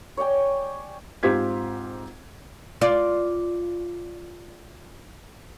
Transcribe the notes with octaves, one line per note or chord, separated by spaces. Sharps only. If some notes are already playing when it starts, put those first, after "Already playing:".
C#5 D5 G5 G#5
G#2 C4 F4 G4 G#6 B6
F4 D5